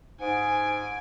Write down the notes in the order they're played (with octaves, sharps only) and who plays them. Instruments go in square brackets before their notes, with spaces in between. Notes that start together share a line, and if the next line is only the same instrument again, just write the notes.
[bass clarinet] G#2 [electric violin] G#5 D7